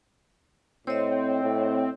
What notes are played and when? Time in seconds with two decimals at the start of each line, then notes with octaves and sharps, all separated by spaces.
0.87 A2 C4 C#5 D#5
1.43 A2